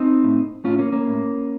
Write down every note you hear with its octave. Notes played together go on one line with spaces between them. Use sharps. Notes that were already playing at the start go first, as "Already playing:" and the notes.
Already playing: C4 D#4
A2
A2 C#4 F4
A#3 C#4
A#3 C#4
A2